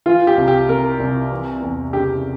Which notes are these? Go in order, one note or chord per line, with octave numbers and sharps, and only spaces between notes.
E3 F4
G4
C2
G4
C3 A#4
C2
E3
E2
C#3 G4